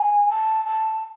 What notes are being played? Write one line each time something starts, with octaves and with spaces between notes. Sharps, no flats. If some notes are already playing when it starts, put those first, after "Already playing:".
Already playing: G#5
A5
A5